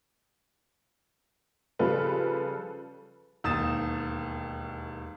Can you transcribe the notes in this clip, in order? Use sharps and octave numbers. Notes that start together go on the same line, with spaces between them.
C#3 F3 G3 F4 A4 B4
E1 D#2 D#6 A6 E7